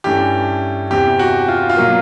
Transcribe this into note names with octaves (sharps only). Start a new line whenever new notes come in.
G2 E3 A3 C#4 G4
E2 C3 E3 G4
F#4
F4
F4
B2 F#3 A#3